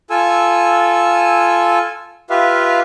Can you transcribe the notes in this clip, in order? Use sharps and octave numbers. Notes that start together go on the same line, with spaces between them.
F4 A4 G#5 E6
F4 G4 B4 E5 F5